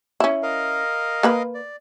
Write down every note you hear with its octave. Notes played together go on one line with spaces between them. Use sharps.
C#4 E4
A#4 D#5 F5
A#3 B4 B5
D5